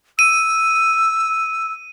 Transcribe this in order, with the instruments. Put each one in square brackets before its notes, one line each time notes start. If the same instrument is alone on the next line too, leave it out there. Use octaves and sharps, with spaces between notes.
[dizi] E6 [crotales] D#7